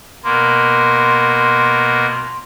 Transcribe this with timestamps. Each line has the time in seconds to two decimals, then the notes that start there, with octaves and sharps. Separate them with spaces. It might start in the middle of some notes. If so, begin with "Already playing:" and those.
0.24 B2 A#3 C6